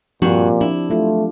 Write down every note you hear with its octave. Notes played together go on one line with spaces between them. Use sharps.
G2 A#2 F3 C4 F#4 G4
D4 E4
F#3 A3 F4